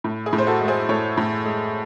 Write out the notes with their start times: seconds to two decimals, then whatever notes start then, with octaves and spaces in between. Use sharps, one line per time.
0.04 A2
0.26 G#4
0.33 A2
0.38 C5
0.47 F#4 A4
0.61 G#3
0.68 G#4 C5
0.89 A2 A4 C#5
1.17 A2
1.46 G#3